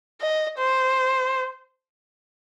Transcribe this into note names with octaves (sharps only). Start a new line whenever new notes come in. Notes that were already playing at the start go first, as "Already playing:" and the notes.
D#5
C5